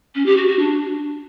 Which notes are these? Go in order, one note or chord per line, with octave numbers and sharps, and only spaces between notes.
C#4
G4
F#4
F#4
D4